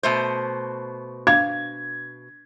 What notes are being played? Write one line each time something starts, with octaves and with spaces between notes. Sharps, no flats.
B2 A3 C5
D4 F5 G#6 A6